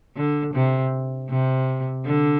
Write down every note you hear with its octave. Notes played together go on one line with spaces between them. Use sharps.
D3
C3
C3
D3